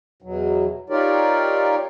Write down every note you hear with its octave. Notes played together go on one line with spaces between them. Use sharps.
E2 B2 F#3
D#4 F4 G4 A#4 C#5 D5